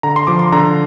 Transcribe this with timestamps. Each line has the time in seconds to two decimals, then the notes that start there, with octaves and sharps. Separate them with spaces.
0.03 D3 A#5
0.16 C6
0.27 F3 D6
0.39 C6
0.52 D3 A#5